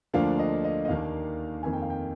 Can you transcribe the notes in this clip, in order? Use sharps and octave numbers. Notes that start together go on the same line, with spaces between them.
D2 D3 F3 A#3 D4 F5
D#5
D#5
D#5
D#2 D#3 A#3 D4 F5
F2 D#3 A#3 D#4 G#5
G5
F5
G5